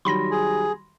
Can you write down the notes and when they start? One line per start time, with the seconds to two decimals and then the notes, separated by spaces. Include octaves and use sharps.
0.05 D#3 F#3 G3 B5 C6 A#6
0.31 G#4